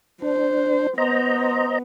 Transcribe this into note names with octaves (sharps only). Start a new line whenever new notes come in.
D4 C5
B3 C5 D#5 A#5